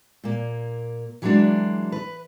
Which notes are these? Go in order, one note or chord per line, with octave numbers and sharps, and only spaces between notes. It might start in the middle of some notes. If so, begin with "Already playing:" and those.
A#2 A#3
E3 F#3 G#3 A#3 D4
B4